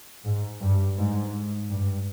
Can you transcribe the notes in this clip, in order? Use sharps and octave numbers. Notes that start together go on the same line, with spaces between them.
G#2
G2
G#2
G2